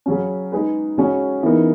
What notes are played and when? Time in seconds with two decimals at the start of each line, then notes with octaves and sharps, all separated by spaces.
0.06 C#3 F#3 C#4
0.52 G#3 D#4 G#4 B4
0.98 C#3 G#3 C#4 F#4
1.43 C#3 E3 B3 D#4 A#4